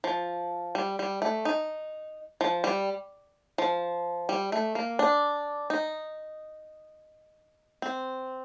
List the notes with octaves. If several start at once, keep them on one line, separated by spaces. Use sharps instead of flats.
F3
G3
G3
A3
D#4
F3
G3
F3
G3
A3
A#3
D4
D#4
C4